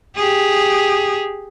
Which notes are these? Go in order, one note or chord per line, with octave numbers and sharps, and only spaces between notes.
G4 G#4